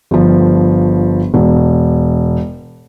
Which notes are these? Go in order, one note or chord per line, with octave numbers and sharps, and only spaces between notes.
G1 F3
E1